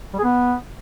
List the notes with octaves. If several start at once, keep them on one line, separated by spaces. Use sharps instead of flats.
G3
G#4
B3